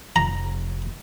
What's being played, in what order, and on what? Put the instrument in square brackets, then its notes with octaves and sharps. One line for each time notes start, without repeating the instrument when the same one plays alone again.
[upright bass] F1 F2 [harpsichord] A#5